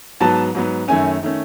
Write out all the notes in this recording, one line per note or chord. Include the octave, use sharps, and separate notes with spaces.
G#2 F#3 B3 A5
G#2 F#3 B3
F#2 D#3 A3 C#4 G#5
D#3 A3 C#4